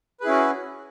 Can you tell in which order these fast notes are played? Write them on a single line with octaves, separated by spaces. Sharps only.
B4 G#4 E4 C#4 F#4